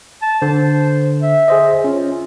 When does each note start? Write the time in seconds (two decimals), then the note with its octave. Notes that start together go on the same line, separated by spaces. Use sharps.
0.22 A5
0.42 D3 C5
1.22 E5
1.48 G#4 C5 D#5
1.84 C#4 F4